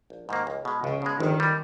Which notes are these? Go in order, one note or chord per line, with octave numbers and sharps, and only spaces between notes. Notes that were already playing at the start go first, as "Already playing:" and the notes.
A#1
G#2 D#3 A#3
C#2
B2 G#3
C#2 C#3
B2 G#3
G1 D#3
G3